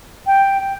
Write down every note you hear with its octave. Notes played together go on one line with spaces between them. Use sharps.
G5